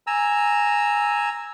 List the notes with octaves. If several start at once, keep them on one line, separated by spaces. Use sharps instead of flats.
G#5 A#5 E6